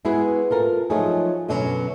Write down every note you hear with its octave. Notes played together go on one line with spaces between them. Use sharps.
G#3 B3 E4 F#4 G#4
F4 A4 A#4
F3 F#3 A3 D#4 F#4 G#4
F#2 B2 D3 F#3 C#4